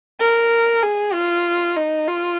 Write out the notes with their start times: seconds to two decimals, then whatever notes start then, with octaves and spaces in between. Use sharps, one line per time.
0.20 A#4
0.82 G#4
1.14 F4
1.77 D#4
2.08 F4